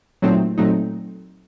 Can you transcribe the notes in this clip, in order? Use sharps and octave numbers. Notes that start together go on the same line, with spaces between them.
A#2 F#3 A3 C4 D#4
A#2 F#3 A3 C4 D#4